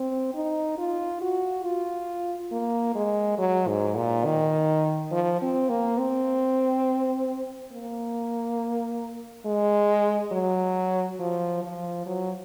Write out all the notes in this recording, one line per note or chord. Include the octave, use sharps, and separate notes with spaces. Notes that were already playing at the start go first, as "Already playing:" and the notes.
Already playing: C4
D#4
F4
F#4
F4
A#3
G#3
F#3
G#2
A#2
D#3
F3
C4
A#3
C4
A#3
G#3
F#3
F3
F3
F#3